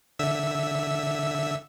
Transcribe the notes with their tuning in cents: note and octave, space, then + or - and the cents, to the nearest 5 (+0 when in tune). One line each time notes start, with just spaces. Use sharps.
D3 +0 E5 +0 E6 -15